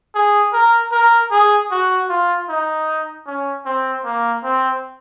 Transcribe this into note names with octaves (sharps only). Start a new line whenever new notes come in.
G#4
A#4
A#4
G#4
F#4
F4
D#4
C#4
C4
A#3
C4